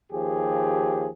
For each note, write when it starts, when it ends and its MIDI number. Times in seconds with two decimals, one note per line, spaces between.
0.11 1.07 39
0.11 1.07 53
0.11 1.07 67
0.11 1.07 68